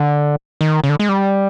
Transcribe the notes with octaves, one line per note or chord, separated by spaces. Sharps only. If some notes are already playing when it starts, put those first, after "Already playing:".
Already playing: D3
D#3
C#3
D3
G#3
G3